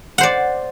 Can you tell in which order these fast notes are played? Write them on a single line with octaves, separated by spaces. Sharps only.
F#5 C5 D5